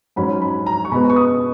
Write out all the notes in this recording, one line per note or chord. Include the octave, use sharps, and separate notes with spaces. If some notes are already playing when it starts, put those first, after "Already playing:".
G#2 F#3 C#4 B5
B5
A#5
C#6
B2 G#3 B3 B5
C#6
D#6